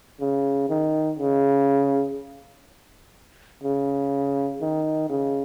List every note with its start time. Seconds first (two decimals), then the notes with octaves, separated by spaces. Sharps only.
0.20 C#3
0.69 D#3
1.19 C#3
3.63 C#3
4.61 D#3
5.10 C#3